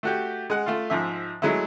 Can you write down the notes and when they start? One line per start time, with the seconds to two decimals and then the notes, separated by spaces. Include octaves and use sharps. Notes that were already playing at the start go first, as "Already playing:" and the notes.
0.03 A3 F#4 G4
0.50 G#3 F#5
0.66 A3 F4
0.90 G#2 F3 E5
1.42 F#3 G#3 A3 E4